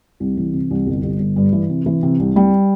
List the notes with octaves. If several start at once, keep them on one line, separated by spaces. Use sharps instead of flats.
C2
E3
C3
C2
G1
G1
G1
G2
E3
C3
E3
C3
C2
G3